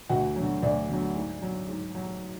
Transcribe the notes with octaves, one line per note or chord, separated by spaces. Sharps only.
D2 F#4
D3 F#3
D2 D4
D3 F#3
G#2
F#3
G#2
F#3